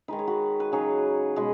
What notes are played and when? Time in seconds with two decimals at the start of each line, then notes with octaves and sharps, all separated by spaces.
0.08 D#3 G#3 D#4 B4
0.19 C#5
0.27 F#4 B4
0.60 B4
0.72 C#3 F#3 D#4 G#4 C#5
1.36 B2 G#3 B4 D#5